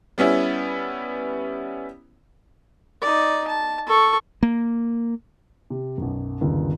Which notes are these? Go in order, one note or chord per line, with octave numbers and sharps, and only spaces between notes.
G3 B3 C#4 E4
D#4 D5
A5
A4 C#6
A#3
C3
B1 F#2
G1 D#2 C#3